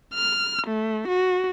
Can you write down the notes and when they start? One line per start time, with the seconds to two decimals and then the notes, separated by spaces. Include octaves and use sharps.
0.15 F6
0.67 A3
1.08 F#4